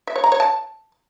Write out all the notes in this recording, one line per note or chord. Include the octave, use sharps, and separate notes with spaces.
E5
C#5
A#5
C#5
A5